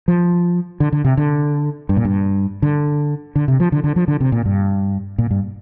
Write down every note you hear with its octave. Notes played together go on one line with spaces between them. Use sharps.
F3
D3
D3
C3
D3
G2
A#2
G2
D3
D3
C3
F3
D3
D3
F3
D3
C3
A#2
G2
A#2
G2